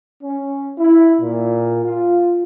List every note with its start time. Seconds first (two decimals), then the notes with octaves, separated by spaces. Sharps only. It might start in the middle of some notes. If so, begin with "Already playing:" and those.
0.23 C#4
0.78 E4
1.21 A#2
1.85 F4